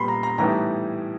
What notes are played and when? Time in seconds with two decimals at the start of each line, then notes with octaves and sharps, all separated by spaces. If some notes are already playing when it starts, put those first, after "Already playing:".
Already playing: A#2 G3 B3 B5 C6
0.08 A#5
0.23 A#5
0.38 A2 E3 G3 B3 D#4 A#5